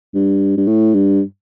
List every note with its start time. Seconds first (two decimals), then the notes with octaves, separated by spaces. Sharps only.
0.15 G2
0.57 G2
0.67 A2
0.94 G2